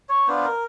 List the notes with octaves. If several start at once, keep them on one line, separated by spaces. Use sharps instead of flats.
C#5
B3 D4 F4 C5
A#4